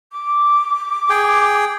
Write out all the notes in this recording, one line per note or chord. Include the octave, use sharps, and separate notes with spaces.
D6
G#4 G5